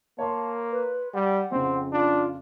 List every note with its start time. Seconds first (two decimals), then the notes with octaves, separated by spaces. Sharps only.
0.19 A#3 C#5 A5 C6
0.72 B4
1.14 G3 F#5
1.52 F2 C#3 C4
1.92 D4 F4